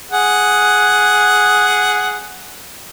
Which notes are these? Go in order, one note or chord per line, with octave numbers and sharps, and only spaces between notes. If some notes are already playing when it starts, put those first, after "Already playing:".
G#4 F#5